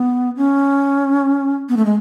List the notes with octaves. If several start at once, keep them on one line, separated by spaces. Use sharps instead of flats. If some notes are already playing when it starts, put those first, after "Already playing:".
Already playing: B3
C#4
B3
A3
G#3